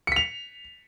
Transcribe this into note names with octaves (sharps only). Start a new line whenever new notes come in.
B6 C#7 F7